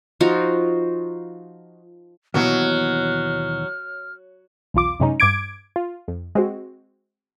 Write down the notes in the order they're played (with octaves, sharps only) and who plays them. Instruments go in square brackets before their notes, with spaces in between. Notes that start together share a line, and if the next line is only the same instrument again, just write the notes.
[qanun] F3 D#4 F4 F#4
[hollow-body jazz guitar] D#2 B2 E3 [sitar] F#3 [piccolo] F6
[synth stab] B1 E2 F4 D6
F#2 C3 G#3 C#4 D#4
G2 D6 G#6 D7
F4
F2
G#3 C4 F#4